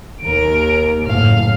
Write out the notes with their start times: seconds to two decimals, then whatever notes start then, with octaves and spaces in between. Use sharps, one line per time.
0.21 D#2 A#4 D7
1.07 F#1 A2 F5